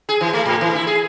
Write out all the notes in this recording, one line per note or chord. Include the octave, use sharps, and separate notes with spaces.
G#4
E3
A3
A2
E3
E4
G#4